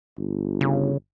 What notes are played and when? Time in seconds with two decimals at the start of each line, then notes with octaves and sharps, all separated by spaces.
0.18 G1
0.61 C#3